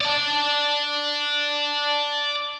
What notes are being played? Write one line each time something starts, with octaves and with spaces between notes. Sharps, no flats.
D5 A5